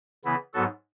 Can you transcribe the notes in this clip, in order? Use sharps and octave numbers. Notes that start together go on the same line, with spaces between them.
C#3 E3 B3 E4
G#2 F#3 B3 F#4 A4